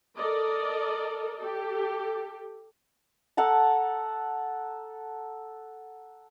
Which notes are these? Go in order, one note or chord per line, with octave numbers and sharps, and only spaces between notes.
A4 A#4 D5 D#5
G4 A4
A4 F#5 A5 A#5